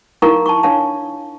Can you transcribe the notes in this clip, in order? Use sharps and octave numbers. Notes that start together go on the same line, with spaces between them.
D#4 E4 A#4 F5 A#5 C#6
A5 C#6
D4 C#5 F5 A5